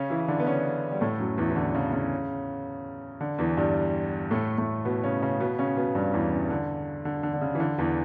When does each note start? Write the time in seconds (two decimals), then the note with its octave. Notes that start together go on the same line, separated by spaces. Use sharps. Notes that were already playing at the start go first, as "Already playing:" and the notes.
Already playing: C#3 C#4
0.10 E3 E4
0.28 D3 D4
0.40 B3
0.46 C#3 C#4
0.91 G3
1.01 A2 A3
1.19 F#2 F#3
1.37 E2 E3
1.50 E3
1.56 D3
1.75 C#3
1.92 C#3
3.21 D3
3.38 E2 E3
3.57 G2 G3
4.31 A2 A3
4.58 A2 A3
4.85 B2 B3
5.03 C#3 C#4
5.22 C#3 C#4
5.40 B2 B3
5.58 C#3 C#4
5.77 B2 B3
5.95 G2 G3
6.13 E2 E3
6.32 C#3
6.50 D3
7.05 D3
7.23 D3
7.33 D3
7.41 C#3
7.55 E3
7.60 D3
7.78 E2 E3